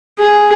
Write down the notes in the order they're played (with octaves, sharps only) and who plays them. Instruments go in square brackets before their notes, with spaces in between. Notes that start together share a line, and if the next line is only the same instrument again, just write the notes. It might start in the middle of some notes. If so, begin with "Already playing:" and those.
[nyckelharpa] G#4